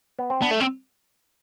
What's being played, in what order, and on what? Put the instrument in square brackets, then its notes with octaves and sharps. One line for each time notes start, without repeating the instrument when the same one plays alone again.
[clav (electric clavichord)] B3
C4
[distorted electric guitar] B3 [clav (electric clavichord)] D4
[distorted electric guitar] A3
C4